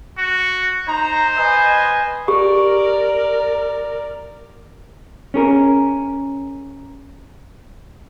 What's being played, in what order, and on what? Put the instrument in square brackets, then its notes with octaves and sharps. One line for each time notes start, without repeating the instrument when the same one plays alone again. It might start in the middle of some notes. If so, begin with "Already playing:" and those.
[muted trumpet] F#4
[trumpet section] D#4 A#5 [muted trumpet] C5
[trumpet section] B4 D#5 G#5
[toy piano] G4 [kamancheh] A#4 D5
[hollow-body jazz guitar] C#4 G#4 A#4